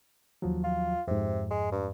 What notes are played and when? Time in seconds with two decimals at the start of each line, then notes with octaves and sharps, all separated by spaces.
0.42 D#2 F3 F#3
0.64 F4
1.07 F2 G#2 C3
1.51 G#3
1.72 G2